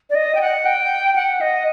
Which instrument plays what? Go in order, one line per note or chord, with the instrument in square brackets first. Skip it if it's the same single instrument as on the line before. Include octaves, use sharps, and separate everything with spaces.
[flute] D5
D#5
G5
F#5
G5
F#5
D#5